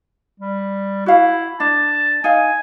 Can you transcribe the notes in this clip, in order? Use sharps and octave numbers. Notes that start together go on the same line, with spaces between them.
G3
E4 F#4 F5
D4 A5
D#4 F5 G#5